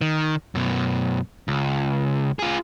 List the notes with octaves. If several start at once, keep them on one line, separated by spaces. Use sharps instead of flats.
D#3
F#2 B2
C#2
F4 G#4